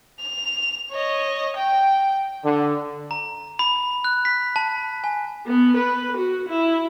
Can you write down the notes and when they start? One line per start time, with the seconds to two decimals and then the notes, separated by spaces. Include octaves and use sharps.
0.20 F7
0.91 C#5 D#5
1.56 G5
2.44 D3
3.11 A#5
3.59 B5
4.04 F#6
4.25 B6
4.56 A5
5.04 G#5
5.46 B3
5.76 B4
6.17 F#4
6.48 E4